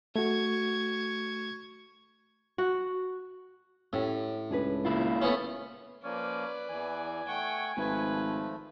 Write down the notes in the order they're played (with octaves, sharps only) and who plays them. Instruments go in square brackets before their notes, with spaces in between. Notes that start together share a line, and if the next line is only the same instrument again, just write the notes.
[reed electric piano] A3 F#4 [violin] C#6 G#6
[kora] F#4
[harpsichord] A2 [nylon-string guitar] C#4 G4
[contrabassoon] C#2 [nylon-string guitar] D4 G#4 B4
[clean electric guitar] A#3 E4 F4
[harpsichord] A3 B3 C#4
[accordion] F3 A#3 [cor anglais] C#4 [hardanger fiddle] B4 D5
[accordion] E2 E3 [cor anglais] G#5
[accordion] A3 F#5 C#6 [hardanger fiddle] G5
[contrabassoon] G#1 [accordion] F3 A3 [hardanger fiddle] B4